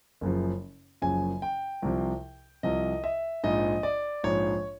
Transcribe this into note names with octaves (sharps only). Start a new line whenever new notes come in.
F#1 F#2 C#3 F3
F#1 F#2 C#3 F3 G#5
G5
C2 C3 F3
C2 C3 F3 D#5
E5
A#1 G#2 F3 D#5
D5
A#1 G#2 F3 C#5